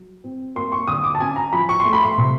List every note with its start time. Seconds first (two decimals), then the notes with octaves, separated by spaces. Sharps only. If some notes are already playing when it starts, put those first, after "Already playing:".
Already playing: F#3
0.24 C4
0.56 A#3 C6
0.72 C#6
0.87 D3 D#6
1.04 D6
1.15 A5
1.20 C#4 G#5
1.36 A#5
1.53 F3 B5
1.69 C#6
1.80 C6
1.85 A3
1.93 B5
2.03 C6
2.18 C3